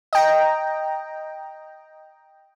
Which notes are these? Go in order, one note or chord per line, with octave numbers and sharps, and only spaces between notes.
D#5 G5 A#5